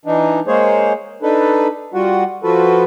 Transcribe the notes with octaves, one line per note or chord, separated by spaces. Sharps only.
E3 D4 D#4
G#3 A#3 G#4 C5 C#5
D4 D#4 A4 B4
G3 F4 F#4 F#5
F3 F4 F#4 A4 B4